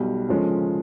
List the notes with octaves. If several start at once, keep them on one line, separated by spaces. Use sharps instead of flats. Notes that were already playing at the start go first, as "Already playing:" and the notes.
Already playing: B1 B2 G3
D2 C#3 F3 G#3 C#4